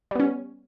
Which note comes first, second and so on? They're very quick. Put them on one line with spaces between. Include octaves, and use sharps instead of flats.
G3 B3 C#4